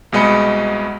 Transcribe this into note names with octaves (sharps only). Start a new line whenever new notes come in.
C2 B2 G#3 D#5 B5 C#7